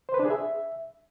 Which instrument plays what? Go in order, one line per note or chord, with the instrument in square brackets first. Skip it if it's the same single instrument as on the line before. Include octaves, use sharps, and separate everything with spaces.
[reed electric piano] C5
B4
D4
G#4
E5